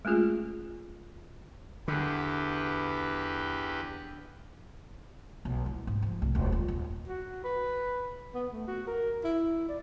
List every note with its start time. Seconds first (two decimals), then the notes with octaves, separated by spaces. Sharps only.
0.05 G#3 A3 C#4 F4 G#4
1.88 E2 D3 G4 B4
5.45 B1
5.66 E4
5.87 G#2
6.02 F3
6.22 C2
6.35 D#1
6.52 F4
6.68 D#1
7.08 F#4
7.44 B4
8.34 B3
8.53 A3
8.67 F#4
8.87 A#4
9.24 E4
9.68 D5